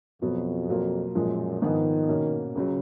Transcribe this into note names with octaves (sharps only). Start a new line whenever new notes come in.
F2 B2 F#3 B3 F#4
B2 F#3 A#3 F4
F#2 A#2 F3 G#3
G#2 D#3 F3 B3 F4 G#4
B2 A#3 C#4
C#2 C#3 F#3